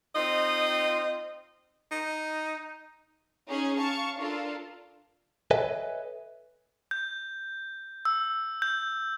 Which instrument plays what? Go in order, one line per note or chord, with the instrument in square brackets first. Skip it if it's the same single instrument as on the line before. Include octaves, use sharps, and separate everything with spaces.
[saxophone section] C4 D#4 F4 D#5
[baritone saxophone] D#4
[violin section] C#4 D#4 G#4 G#5
F5 A5 C#6
D4 F4 A4 A#4
[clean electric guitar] A4 B4 C#5 D#5 E5 G#5
[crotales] G6
E6
G6